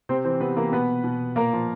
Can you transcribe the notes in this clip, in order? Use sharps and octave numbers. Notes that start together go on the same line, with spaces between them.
C3 C4 C5
E3 C4 C5
C3 B3 B4
E3 A#3 A#4
B2 B3 B4
B2
A#2 A#3 A#4
F3